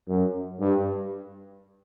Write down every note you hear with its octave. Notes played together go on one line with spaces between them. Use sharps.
F#2
G2